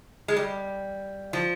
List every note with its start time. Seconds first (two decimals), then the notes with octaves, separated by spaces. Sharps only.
0.28 G#3
0.37 G3
1.33 F3